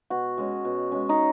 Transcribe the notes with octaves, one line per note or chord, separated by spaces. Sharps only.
B2 F#4
G#3 C#4
B2
G#3 C#4
D#4